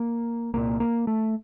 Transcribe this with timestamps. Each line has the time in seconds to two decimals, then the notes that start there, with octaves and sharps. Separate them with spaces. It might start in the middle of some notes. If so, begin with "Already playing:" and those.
Already playing: A#3
0.54 C2 A#2 A#3
0.80 A#3
1.07 A3